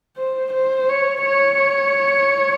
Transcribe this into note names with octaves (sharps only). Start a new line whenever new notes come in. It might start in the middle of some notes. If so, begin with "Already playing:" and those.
C5
C5
C#5
C#5